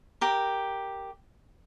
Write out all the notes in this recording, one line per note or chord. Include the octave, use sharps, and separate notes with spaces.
G4 A#4